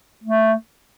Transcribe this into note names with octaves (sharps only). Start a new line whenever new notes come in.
A3